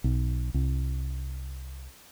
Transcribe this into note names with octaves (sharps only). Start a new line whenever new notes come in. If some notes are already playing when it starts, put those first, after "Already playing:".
B1
C2